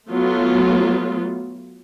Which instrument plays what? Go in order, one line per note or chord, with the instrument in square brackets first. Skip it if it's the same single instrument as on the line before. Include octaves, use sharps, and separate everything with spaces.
[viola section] F#3 A3 B3 F4